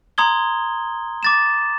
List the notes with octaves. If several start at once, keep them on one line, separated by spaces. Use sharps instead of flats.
A#5 C6 D#6 G#6 G7
D6 A6 E7